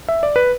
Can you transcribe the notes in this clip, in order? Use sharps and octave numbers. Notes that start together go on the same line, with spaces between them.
E5
D5
B4